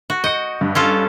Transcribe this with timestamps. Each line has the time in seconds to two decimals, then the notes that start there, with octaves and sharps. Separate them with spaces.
0.10 F#4
0.24 D#5 G6 C#7
0.61 G2
0.75 C#4 F4 A4